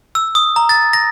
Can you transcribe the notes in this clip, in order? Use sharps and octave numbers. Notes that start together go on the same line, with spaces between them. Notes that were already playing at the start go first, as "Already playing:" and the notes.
E6
D#6
A#5
A6
A#6